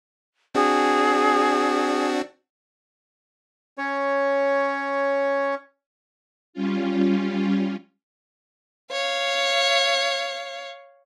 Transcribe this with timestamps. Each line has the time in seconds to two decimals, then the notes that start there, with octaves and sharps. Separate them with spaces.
0.55 C4 D4 F#4 G#4
3.78 C#4 C#5
6.53 G3 C#4 F4
8.91 C#5 F5